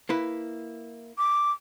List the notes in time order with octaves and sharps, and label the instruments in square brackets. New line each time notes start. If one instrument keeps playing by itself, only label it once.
[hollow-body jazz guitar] A#3 E4 B4
[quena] D6